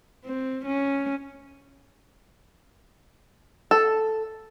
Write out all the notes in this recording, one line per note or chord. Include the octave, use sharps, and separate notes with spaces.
C4
C#4
A4